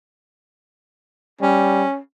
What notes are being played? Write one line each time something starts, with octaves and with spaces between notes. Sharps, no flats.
G3 C#4